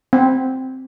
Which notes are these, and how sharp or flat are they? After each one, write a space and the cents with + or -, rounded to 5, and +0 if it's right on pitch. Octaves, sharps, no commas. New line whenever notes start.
C4 +0